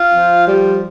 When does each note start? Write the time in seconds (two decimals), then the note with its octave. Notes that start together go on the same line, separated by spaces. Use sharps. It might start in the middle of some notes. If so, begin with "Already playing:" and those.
Already playing: F4
0.14 F3
0.47 G3